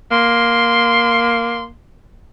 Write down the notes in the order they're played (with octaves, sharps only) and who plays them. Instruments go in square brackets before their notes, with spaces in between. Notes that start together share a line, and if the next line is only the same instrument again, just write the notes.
[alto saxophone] A#3 [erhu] C6